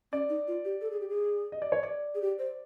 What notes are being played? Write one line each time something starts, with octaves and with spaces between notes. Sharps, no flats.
C#4 D5
D#4
F4
G4
A4
G#4
G4
G#4
D#5
D5
C#5
D5
G#4
G4
C5